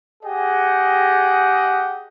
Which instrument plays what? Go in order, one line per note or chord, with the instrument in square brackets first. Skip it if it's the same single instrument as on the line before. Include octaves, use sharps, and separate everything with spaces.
[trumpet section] G4 G#4 D#5 F#5 G5